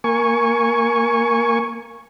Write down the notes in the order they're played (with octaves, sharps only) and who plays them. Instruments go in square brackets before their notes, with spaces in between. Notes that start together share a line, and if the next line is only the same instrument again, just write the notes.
[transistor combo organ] A#3 G#5 C#6